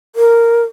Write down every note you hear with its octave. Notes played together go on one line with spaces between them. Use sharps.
A#4